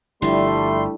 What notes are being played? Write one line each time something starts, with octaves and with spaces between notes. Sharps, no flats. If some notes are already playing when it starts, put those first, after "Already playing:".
G1 F3 G3 A3 D4 E4 C6